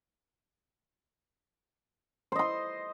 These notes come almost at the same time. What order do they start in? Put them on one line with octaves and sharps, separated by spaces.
C5 D#5 C6